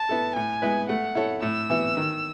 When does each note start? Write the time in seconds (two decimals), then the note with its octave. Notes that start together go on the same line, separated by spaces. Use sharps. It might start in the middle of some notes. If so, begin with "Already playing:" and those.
Already playing: A5
0.09 B3 E4 A4
0.36 A2 G#5
0.62 G#3 B3 E4 B4
0.89 A3 F#5
1.15 E4 A4 C#5
1.42 A2 E6
1.70 E3 B3 E4
1.97 D#3